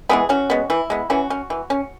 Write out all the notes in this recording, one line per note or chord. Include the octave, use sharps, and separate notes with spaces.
E3 G#3 B3 E4 G#4
E3 C#4 F#4
G#3 B3
E3 E4
G#3 B3
E3 C#4 F#4
C#4
E3
C#4